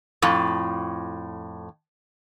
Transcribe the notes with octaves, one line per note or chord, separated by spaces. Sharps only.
F2 A2